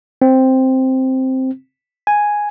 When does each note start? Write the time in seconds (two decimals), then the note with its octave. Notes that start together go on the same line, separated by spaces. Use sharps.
0.22 C4
2.07 G#5